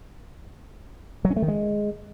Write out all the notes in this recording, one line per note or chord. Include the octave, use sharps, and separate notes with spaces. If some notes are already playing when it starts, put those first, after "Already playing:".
F#3
C#4
A3
D#3
G#3